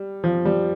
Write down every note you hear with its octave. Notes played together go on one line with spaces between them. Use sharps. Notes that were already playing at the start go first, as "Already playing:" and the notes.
Already playing: G3
F3
G3